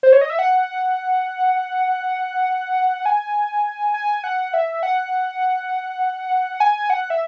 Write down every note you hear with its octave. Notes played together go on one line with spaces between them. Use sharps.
C5
C#5
D#5
E5
F#5
G#5
G#5
F#5
E5
F#5
G#5
F#5
E5